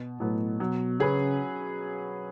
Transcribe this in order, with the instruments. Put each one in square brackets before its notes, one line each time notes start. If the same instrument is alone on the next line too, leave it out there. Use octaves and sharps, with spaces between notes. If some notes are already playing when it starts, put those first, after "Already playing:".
Already playing: [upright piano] B2
[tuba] A2 [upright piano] F#3 B3
[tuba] B2 [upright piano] F#3
[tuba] C#3 [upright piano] C#4 G#4 B4